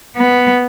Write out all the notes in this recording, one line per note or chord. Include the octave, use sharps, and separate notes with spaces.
B3